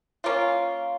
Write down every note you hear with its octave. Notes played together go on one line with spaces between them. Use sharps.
A#3 C#4 F4